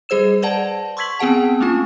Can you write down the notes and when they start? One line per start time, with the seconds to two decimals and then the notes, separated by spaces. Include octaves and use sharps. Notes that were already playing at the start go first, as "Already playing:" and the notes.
0.09 G3 G#4 C5 E6 E7
0.42 B4 C5 D5 F#5 A5
0.97 C6 C#6 E6 G#6 B6 F#7
1.19 B3 C4 G#4 F#5 A5
1.60 A3 A#3 C#4 F4 G#5